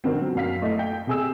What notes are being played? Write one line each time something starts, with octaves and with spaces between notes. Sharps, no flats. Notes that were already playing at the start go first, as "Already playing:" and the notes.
B2 D3 D#3 C4
F#3
F#2 F5 B6
A3 E4 A4 D#5
G5
C3 G#4 E6